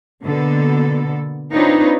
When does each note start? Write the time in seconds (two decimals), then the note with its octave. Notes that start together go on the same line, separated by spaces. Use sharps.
0.23 B2 D3 A#3 B3 A4
1.52 C4 D4 D#4 F4 B4 C#5